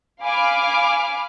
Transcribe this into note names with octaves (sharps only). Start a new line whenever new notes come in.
F5 G#5 B5 D6 F6